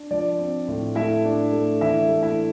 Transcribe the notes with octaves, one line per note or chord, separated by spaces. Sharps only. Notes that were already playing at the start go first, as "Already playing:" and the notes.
Already playing: D4
F3 D5
C4
A2
A3 E4 E5
D4
A3
E3 E4 E5
A3
E4 E5